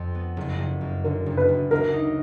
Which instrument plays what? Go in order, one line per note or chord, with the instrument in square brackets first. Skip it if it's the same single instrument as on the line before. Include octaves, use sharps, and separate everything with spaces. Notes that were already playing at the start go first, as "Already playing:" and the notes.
Already playing: [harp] F2
B3
F#1
F#1
F#2
[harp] D3 [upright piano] A#4
[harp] F#1
[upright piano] B4
[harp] F#1
[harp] D2 [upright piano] A#4
[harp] D#4